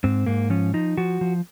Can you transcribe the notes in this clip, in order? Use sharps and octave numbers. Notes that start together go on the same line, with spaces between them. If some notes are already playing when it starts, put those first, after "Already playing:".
G#2 C4
G#2 A#3
F3 C#4
F3 D#4
F3 F#4
F3